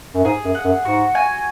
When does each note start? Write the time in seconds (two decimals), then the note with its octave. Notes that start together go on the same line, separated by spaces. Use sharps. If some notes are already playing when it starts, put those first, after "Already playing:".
0.14 F#2
0.25 G#2 G#4
0.45 F#2
0.55 F#5
0.65 F#2
0.85 G#2 F#4
1.15 G#5